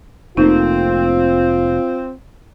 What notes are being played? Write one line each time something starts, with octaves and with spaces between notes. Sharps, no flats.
F1 A3 A#3 C4 D#4 F4